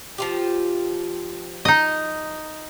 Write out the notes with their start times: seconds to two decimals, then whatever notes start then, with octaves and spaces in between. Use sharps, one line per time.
0.18 F3 F4 G4
1.65 D#4 D#5